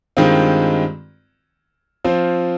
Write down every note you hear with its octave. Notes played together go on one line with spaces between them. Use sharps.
G2 D#3 G#3 C4 F4
F3 C4 F4 C5